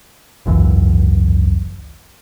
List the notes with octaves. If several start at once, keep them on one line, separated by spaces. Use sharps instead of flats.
G#1 C#2 F#2 E3